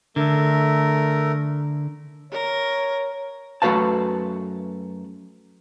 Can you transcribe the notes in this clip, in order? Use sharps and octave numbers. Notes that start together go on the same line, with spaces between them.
D3 A3 A#4
A#4 C#5
F#2 A3 F#4 B4 F5 A5